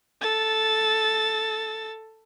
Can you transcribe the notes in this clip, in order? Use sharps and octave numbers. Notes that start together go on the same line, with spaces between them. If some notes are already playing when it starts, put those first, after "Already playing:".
A4 A6